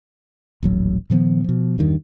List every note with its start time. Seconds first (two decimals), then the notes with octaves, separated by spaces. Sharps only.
0.63 D#1 A1 F#3
1.10 A#2 D#3 F3 B3
1.44 B2 F3
1.78 E2 G2 D#3